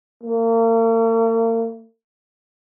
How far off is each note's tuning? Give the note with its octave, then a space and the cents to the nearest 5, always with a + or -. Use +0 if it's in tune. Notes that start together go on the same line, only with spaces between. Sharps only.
A#3 -40